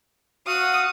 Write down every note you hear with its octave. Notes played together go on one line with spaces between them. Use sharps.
F#4 F5 F#5 D#6